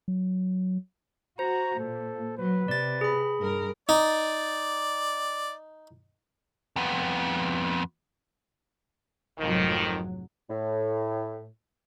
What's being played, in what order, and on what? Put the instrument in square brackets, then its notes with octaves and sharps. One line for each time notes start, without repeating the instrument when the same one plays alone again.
[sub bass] F#3
[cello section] F#4 [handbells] C5 [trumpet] A#5
[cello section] A#2 [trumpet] A4
[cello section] F#3 [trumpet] B4
[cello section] C3 [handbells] D5 A6
[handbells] G#4 B5
[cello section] G2 A#4
[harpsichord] D#4 [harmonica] D5
[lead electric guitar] F2 B3
[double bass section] F1 G#2 F#3 [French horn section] F2 D#3
[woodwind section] A2